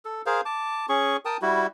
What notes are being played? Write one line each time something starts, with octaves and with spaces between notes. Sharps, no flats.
A4
G#4 A#4 C5 F5
A5 D6
C#4 G#4 C#6
A#4 G5 A5 D#6
G3 E4 F#4